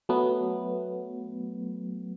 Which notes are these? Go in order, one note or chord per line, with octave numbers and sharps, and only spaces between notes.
F#3 A3 B3